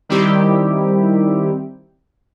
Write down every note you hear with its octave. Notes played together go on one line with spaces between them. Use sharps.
D#3 G3 C4 E4 G4